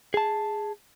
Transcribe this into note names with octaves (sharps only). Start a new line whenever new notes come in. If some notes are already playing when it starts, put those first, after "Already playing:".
G#4 A5